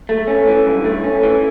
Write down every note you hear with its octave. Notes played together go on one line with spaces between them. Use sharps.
A3
C#4
E3
G2
A3
C#4
E3